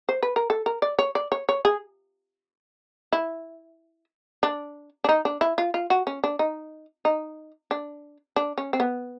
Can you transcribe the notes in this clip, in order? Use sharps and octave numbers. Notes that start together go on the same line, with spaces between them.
C5
B4
A#4
A4
A#4
D5
C#5
D5
C#5
C#5
G#4
E4
D4
D4
D#4
D4
E4
F4
F4
F#4
C#4
D4
D#4
D#4
D4
D4
C#4
C4
B3